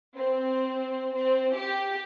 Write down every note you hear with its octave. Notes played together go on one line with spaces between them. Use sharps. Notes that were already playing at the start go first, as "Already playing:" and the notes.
C4
C4
G4